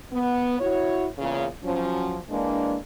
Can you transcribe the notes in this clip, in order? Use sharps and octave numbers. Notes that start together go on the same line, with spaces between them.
B3
E4 F#4 C#5
E2 A#2 C#3
F3 F#3 C#4
E3 G#3 A#3 D4